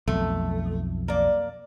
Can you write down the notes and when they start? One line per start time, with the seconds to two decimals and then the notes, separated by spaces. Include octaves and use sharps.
0.08 B1 F2 A3
1.08 A#3 D5